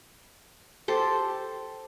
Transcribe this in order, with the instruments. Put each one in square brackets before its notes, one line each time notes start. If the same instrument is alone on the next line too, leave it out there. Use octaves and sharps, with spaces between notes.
[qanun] G4 A4 C5